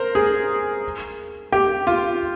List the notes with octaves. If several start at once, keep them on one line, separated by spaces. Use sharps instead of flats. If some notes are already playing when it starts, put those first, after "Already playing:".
Already playing: A#4 C5
G#4
G4
F4